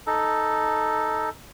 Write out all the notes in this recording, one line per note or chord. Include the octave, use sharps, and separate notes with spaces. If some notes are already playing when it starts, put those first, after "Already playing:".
D#4 A4